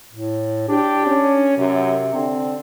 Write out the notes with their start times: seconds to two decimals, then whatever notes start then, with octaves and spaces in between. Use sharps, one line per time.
0.13 A2
0.68 D4 G4
1.07 C#4
1.58 F#2 C3
2.14 D3 C4